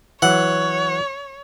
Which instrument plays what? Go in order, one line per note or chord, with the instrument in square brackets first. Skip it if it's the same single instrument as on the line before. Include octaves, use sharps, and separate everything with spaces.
[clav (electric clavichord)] E3 F#3 [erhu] C#5 [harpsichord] F#5